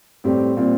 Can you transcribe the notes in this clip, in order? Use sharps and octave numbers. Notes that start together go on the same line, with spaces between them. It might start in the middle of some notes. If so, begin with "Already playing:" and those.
A2 G3 C4 G4
A#2 G3 C4